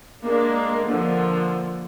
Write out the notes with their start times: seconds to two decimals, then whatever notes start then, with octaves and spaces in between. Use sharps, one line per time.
0.25 G#3 A#3 D4
0.88 D3 F3 A#3